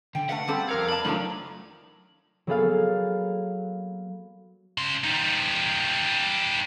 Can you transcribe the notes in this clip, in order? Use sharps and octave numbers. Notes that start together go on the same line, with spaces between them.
D3 G5
A3 B4 F5 F#5
G3 C4 A4
F2 A#4 F5 G#6
B4 D5 A5 B5
D#3 F3 F#3 A3 D4
F#3 A#3 B3 G#4 A4 F5
C#3 C6
G3 D#4